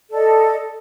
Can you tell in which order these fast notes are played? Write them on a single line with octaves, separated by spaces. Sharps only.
A4 D5 D#5